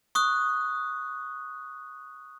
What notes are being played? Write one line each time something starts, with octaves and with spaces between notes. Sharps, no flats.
C#6 D#6 F#6